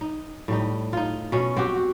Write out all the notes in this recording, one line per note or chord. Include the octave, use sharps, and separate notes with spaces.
D#4
A2 G3 D#4
D#4 F4
B2 C#4
C4 F#4 G4
F#4